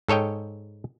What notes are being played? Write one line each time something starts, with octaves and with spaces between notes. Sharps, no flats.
G#2 A4 C#5 D#5 G5